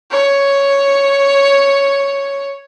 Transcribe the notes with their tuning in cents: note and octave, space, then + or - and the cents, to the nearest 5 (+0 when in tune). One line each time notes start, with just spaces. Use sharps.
C#5 +0